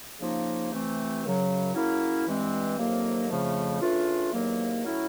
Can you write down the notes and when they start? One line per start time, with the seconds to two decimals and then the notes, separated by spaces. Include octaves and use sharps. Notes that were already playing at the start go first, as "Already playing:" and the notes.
0.19 C#3 F3 A#3 D#4
0.72 C3 E3 A3 C4
1.23 F#2 C#3 F#3
1.74 C#3 F#3 A#3 C#4 E4
2.27 G2 E3 G#3 C4
2.78 F2 C3 D#3 F#3 A#3
3.30 F2 C#3 F3 A3
3.81 C#3 E3 A3 D4 F4
4.33 E2 C3 D#3 F#3 A#3
4.84 A2 F#3 A3 C#4 E4